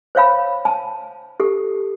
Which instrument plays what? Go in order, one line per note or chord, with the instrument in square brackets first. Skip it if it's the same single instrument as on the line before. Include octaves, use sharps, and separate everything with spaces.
[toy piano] C5 C#5 F5 B5
A5
G4 A4